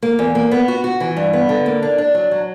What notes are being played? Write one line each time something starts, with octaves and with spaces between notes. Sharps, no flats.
A#3
E2
A#3
B3
F#4
F#4
E3
G2
B3
D3
A#3
D4
D4
F#3
F#3